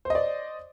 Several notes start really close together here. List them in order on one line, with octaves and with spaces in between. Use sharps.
C5 D#5 D5